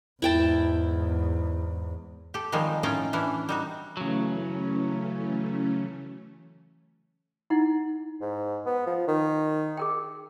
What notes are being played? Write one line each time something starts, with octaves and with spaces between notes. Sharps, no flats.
E2 G#2 E4 G5 A5
G4 A4
D#3 F3 G3 G#3 C4
A2 C#4 D#4 F4 G5
E3 C#4 D4 E4
G3 D#4 F#4
C#3 E3 F#3 A3 C#4
D#4 E4 F#5
G#2
B3
F3
D#3
G#4 A#4 G5